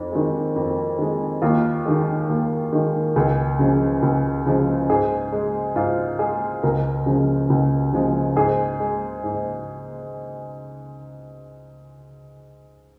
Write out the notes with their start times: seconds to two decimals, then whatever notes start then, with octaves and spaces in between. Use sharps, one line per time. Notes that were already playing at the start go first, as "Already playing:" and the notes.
Already playing: F2 D#4
0.12 D#3 G#3
0.56 F2
0.99 D#3 G#3
1.42 D#2 F4
1.86 D#3 G#3
2.29 D#2
2.73 D#3 G#3
3.16 C#2 G#4
3.59 C#3 F3 G#3
4.02 C#2
4.46 C#3 F3 G#3
4.90 G#2 G#4
5.32 G#3
5.76 G#2 F4
6.19 G#3 G#4
6.63 C#2 A#4
7.06 C#3 F3 G#3
7.50 C#2
7.93 C#3 F3 G#3
8.36 G#2 G#4
8.80 G#3
9.24 G#2